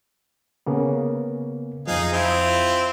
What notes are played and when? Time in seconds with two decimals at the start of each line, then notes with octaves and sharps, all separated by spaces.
0.66 C#3 A#3 B3
1.88 F2 F3 D#4 G#4 F5
2.13 C4 E4 F4